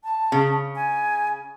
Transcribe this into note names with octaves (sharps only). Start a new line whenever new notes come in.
A5
C#3
G#5